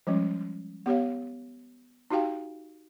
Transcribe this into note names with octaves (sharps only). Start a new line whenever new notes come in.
F3 G3 G#3 C#4
B3 G4 C#5 F5
D#4 F#4 G4 F5 G5